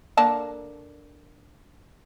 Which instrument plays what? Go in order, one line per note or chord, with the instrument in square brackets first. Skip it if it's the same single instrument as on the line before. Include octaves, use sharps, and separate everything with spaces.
[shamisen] D3 A#3 A5